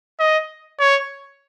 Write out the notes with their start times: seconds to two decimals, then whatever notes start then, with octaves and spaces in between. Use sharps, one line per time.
0.20 D#5
0.80 C#5